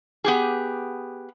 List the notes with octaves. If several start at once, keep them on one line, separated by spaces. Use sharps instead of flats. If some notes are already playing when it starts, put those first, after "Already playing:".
B3 G4 G#4